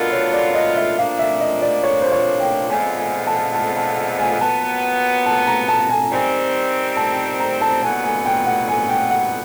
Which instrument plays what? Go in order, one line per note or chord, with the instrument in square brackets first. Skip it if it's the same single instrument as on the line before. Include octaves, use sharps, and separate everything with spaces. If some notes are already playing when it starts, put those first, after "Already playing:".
Already playing: [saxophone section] D3 F#3 B3 D4 F4 [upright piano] A#4 D#5
[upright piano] C#5
D5
D#5
E5
[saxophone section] A#2 F3 A#3 D4 [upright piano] F5
[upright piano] E5
D#5
D5
C#5
C5
C#5
G5
[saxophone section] F2 D3 F3 G#3 B3 [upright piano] G#5
[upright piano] G#5
A5
A5
A5
G#5
[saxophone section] A#2 F#3 B3 [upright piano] A5
[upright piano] A5
A#5
A5
G#5
[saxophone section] D#3 G3 C4 [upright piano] G#5
[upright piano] A5
A#5
A5
[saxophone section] D#2 D3 F#3 B3 [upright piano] G#5
[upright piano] G#5
G5
F#5
G#5
G5
F#5